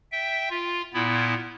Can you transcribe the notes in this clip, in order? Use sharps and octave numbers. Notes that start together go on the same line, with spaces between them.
E5 G5
F4
A#2 B3 E4